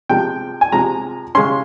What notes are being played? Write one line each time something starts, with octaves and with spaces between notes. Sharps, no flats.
C3 F3 G#3 G5
G#5
C3 F3 G#3 A#5
C#3 G#3 C#4 C6